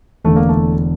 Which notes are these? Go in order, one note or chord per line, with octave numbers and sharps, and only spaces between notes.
E1 E2 D3 A3
A#3
A3